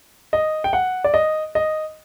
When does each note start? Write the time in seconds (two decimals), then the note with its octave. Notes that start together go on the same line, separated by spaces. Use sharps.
0.33 D#5
0.64 G5
0.73 F#5
1.04 D5
1.14 D#5
1.55 D#5